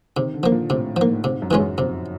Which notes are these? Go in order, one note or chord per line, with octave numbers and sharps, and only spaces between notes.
C3 D#3
D3
F3 A#3
A#2
A2 C3
G#2 F3 A#3
A2
G#2 C3
F#2
E3 G#3 C#4 F4
F#2
F2 C3